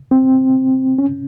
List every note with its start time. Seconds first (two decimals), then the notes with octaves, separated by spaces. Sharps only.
0.11 C4
0.98 C#4